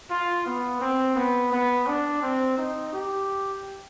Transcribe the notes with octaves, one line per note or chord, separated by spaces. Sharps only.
F4
B3
C4
B3
B3
D4
C4
D#4
G4